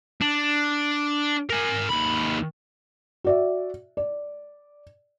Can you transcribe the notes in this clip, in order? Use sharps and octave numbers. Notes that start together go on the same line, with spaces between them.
D4
A#4 G#5
D#2 B5
F#4 D5 E5
D5